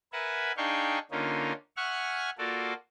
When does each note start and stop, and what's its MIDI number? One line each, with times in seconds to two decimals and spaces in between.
0.13 0.52 70
0.13 0.52 71
0.13 0.52 76
0.13 0.52 78
0.13 0.52 80
0.57 0.99 62
0.57 0.99 63
0.57 0.99 68
0.57 0.99 77
0.57 0.99 79
0.57 0.99 85
1.11 1.53 50
1.11 1.53 58
1.11 1.53 61
1.11 1.53 63
1.11 1.53 65
1.77 2.30 76
1.77 2.30 78
1.77 2.30 80
1.77 2.30 85
1.77 2.30 89
1.77 2.30 90
2.38 2.73 58
2.38 2.73 65
2.38 2.73 66
2.38 2.73 69
2.38 2.73 74